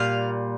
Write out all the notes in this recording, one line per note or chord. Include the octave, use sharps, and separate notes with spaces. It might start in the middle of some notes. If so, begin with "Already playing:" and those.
Already playing: A#2 G3 F5